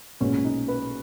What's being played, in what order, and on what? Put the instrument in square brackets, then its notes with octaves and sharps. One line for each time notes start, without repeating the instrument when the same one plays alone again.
[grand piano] B1 A#2 G#3 B3 C#4
D#4
B4